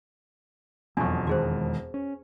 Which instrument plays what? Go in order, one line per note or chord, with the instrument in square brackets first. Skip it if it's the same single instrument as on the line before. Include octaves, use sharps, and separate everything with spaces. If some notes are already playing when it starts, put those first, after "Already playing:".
[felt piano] E1 F2 [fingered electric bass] F#3 [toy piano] G#5 C#6
[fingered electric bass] D#3 G#3 [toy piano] F#4 G#4 C5
[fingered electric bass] C#4